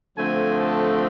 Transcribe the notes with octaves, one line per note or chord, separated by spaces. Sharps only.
D3 F3 A3 C4 G#5
A5